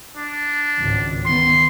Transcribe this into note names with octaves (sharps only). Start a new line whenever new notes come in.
D4
G#1 C#2
D#3 B3 C6